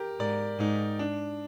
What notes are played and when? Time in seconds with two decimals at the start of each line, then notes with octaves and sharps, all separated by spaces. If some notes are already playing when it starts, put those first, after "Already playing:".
Already playing: G4 A#4
0.20 G#2 A#4 D5
0.59 G#2 D#4
0.99 D4